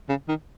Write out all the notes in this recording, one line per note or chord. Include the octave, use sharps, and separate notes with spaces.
C#3
D#3